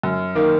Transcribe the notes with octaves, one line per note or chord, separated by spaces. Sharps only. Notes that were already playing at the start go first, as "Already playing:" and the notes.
F#2
D#3 A#3